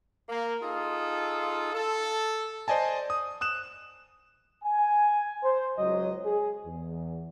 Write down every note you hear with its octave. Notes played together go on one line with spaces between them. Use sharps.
A#3
D#4 F4 G#4 A4
A4
C5 D5 D#5 G#5 A5
D#6
D#6 F#6 E7
G#5
C5
C#2 F#3 D#5
G#4
E2